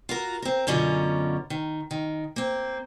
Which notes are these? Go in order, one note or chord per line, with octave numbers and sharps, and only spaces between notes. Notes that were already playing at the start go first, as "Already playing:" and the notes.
F4 F#4 A#4
C4 A#4
F#2 B2 D3 C#4 F4 A#4
D#3
D#3
A#3 C4